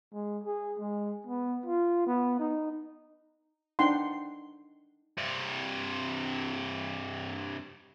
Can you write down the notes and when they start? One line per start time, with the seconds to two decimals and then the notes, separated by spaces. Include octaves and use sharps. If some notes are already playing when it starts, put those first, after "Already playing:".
0.13 G#3
0.43 G#4
0.79 G#3
1.27 B3
1.66 F4
2.06 B3
2.39 D#4
3.79 D4 D#4 F#5 G5 C6
5.18 G2 C3